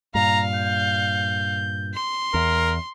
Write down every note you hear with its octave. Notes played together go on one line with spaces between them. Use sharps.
G2 A#2 F5 A#5
G6
C6
E2 A#4